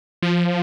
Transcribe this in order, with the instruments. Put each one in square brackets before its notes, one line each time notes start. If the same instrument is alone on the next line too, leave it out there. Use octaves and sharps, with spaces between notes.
[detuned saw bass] F3